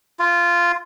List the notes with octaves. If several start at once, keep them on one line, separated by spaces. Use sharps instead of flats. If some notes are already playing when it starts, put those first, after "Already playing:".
F4